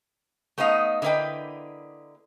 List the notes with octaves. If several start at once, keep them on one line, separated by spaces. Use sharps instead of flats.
A3 B3 D#4 D#5 F5
D3 A#3 E4 B4 D#5 G5